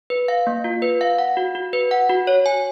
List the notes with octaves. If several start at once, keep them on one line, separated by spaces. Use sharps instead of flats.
B4
F5
A#3
F4
B4
F5
F#5
F#4
F#4
B4
F#5
F#4
C#5
G#5